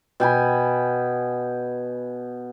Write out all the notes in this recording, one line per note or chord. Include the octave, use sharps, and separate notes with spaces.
B2 G5 G#5 B5